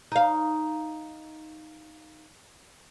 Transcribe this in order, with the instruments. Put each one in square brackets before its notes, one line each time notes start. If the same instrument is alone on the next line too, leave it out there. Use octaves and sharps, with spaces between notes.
[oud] D#4 F5